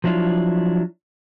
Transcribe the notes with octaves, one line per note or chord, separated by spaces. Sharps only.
F3 F#3 D4 E4 F4